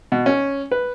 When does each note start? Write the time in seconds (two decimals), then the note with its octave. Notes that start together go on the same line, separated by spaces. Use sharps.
0.12 B2
0.26 C#4
0.72 B4